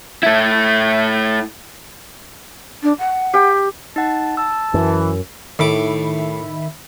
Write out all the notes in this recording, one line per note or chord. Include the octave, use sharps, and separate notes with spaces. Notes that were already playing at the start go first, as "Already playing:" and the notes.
A3 E4
D4
F#5
G4 G5
D#4 F#5 A5
A5 E6
F#2 E3
A2 D#3 E5 B5 D6